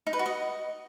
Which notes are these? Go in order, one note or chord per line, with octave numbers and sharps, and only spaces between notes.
D#4
B4
F#4
D#5